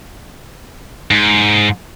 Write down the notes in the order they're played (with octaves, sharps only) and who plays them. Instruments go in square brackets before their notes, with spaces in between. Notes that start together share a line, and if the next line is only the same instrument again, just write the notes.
[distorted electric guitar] G#2